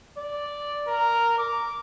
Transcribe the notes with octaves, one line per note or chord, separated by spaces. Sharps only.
D5
A#4
D6